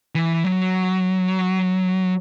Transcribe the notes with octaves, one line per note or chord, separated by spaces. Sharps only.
E3
F#3